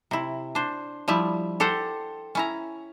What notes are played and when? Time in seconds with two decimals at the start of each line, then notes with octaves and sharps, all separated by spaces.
0.11 C3 E4
0.55 D4 C5
1.08 F3 G3 E4 E5
1.60 G4 A4 C5 F#5
2.35 C#4 E4 A#5